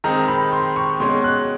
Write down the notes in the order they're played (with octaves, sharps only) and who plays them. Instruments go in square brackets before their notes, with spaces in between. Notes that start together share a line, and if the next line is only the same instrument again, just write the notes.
[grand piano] D#3 G#3 C4 D#4 A#5
B5
C6
C#6
B2 G#3 C#4 C6
F#6